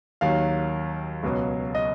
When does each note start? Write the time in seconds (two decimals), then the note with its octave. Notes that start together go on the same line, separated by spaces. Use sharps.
0.21 D#2 D#3 F#3 F5
1.23 C#2 B2 F#3
1.75 D#5